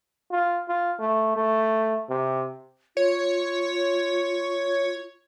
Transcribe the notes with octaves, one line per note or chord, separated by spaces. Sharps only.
F4
F4
A3
A3
C3
F4 C#5